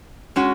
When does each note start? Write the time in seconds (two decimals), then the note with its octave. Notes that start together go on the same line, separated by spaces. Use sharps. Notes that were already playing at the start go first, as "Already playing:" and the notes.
0.36 G#3 C#4 F#4